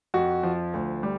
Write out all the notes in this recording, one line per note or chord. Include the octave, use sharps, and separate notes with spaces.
F2 F#4
F3
D2
G3